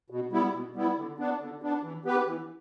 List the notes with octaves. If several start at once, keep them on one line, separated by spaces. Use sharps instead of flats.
B2
G3 B3 E4
B2
G3 B3 E4
D3
B3 D4
D3
B3 D4
E3
B3 G4 B4
E3